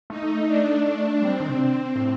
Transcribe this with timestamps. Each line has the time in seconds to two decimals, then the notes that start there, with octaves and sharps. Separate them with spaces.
0.10 A3 D#4
0.22 A3
0.35 A3
0.47 D4
0.84 D4
1.22 G3 C4
1.40 D#3
1.49 C3
1.96 A2